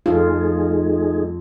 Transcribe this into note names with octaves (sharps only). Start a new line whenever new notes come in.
F2 A3 C4 D#4 F4 F#4 G#4